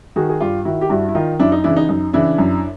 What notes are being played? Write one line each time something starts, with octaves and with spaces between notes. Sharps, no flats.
D#3 F#4 G#4
G#4
G2 F4 G4
D#3 E4 F#4
G4
G2 E4 F#4
E4
D#3 D#4 F4
F#2 D4 E4
D#4
C#3 E3 D4 E4
D#4
F#2 D#4
C#3 E3 D4 E4
F#2